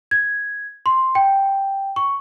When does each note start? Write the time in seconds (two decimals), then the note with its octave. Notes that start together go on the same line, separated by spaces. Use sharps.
0.11 G#6
0.86 C6
1.15 G5
1.96 C#6